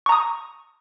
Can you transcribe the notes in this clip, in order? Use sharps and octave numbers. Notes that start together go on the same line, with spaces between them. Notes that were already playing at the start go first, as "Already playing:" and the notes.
A#5 C#6 D#6